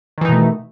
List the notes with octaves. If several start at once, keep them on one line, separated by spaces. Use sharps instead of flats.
B2 D#3 E3 A3 D#4